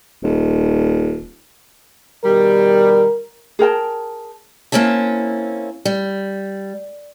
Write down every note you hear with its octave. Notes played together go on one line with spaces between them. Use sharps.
D#1
B2 D#3 G3 A#4
G#4 A#4 G5 A5
A#3 C4 C#4 E4 A5
G3